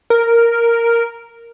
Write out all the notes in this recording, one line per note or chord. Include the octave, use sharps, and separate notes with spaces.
A#4